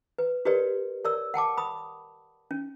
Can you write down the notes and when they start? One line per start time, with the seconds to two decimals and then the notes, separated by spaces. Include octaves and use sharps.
0.18 B4
0.45 F#4 G4 A#4 B4 C#5 D5
1.05 A#4 C#5 D5 E6
1.34 F#5 G5 A5 D6
1.57 B5 D#6
2.51 C#4